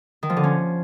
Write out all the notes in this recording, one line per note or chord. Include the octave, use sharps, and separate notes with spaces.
D#3
F3
D3
C#4